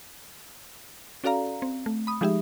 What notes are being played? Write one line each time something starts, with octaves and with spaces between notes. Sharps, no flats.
C#4 F#4 A4 D5 F5 A#5
C4
A3
B5 D#6
F3 G#3 D#4 G4 G#4 E5